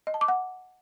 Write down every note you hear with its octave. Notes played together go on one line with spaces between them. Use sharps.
D#5
A5
D6
F#5